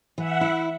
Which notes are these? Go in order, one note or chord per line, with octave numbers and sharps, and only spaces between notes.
E3 E5 F#5
E4